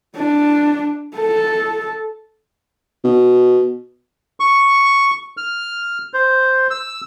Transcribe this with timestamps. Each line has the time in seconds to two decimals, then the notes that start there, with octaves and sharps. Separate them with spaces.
0.17 D4
1.17 A4
3.04 B2
4.40 C#6
5.37 F6
6.14 C5
6.71 E6